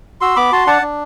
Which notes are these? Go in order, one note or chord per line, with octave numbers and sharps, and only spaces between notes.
F#4 C6 E6
B3 B5 D6
F#4 A5 C6
D4 F#5 A5
D4